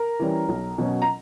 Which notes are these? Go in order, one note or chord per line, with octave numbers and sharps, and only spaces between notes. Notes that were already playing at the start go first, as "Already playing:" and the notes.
Already playing: A#4 A#5
E3 G3 C#4
B1
B2 F#3 C#4
A#5